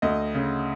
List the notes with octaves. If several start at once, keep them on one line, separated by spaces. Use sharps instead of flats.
D2 D#5
C#3